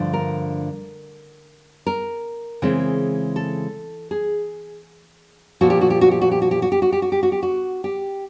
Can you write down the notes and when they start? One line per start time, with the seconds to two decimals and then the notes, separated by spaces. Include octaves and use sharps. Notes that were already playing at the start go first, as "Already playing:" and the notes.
Already playing: G2 D3 F3 A3
0.13 A#4
1.86 A#4
2.62 C#3 E3 G#3 C4
3.36 A4
4.11 G#4
5.61 A#2 F3 A#3 F#4
5.70 G4
5.81 F#4
5.90 G4
6.01 F#4
6.11 G4
6.21 F#4
6.31 G4
6.42 F#4
6.51 G4
6.62 F#4
6.72 G4
6.82 F#4
6.92 G4
7.02 F#4
7.12 G4
7.23 F#4
7.32 G4
7.43 F#4
7.84 G4